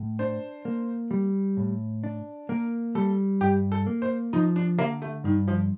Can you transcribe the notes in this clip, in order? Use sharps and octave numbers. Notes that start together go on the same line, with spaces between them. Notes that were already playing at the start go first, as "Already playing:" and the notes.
Already playing: A2
D4 C5
A#3
G3
A2
D4
A#3 A#4
G3 A4
G2 G4
A4
A#3
C5
F3 D#4
D4
D3 A#3
A3
G2 D#3
F3